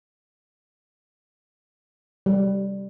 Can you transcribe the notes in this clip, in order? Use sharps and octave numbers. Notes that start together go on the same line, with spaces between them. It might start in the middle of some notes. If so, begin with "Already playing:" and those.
G3